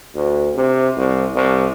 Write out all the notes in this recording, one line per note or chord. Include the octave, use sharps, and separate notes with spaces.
D2
C3
C2
C2